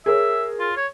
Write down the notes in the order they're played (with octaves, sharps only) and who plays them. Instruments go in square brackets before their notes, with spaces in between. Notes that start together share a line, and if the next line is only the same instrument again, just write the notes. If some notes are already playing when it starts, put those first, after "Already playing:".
[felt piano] G#4 A#4 C#5 [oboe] E5
[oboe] F4
C#5